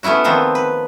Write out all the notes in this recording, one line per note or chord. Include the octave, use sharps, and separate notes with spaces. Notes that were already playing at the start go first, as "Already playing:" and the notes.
A3 B3 C#4 E4 F#4
D#3 F3 B3 C4
B4